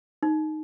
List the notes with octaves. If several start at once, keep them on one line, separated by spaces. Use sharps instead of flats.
D#4